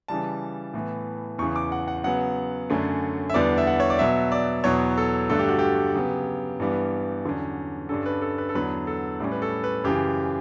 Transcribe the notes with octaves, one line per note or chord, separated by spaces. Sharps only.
C#3 E3 G3 A5
A2 E3 B3
E2 C#3 E3 C#6
D6
F#5
F#5
C#3 F#3 B3 F#5
F#2 D3 A3 C#4
E5
E2 D3 G3 B3 D5
E5
F#5
C#5
D5
B2 F#3 B3 E5
D5
E2 B2 F#3 B3 C#5
A4
G2 D3 A3 A4
G4
F#4
G4
C#3 F#3 B3
G2 E3 G3 B3
E2 D3 F#3 C#4
G2 D3 G3 C#4 A4
B4
A4
B4
A4
E2 D3 F#3 B3 B4
A4
A2 G3 C#4
B4
A4
B4
F#2 C#3 E3 G4